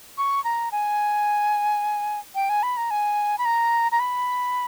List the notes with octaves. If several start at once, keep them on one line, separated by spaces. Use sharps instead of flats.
C#6
A#5
G#5
G5
G#5
B5
A#5
G#5
B5
A#5
A#5
B5